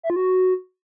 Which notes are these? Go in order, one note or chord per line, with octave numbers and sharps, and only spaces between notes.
E5
F4
F#4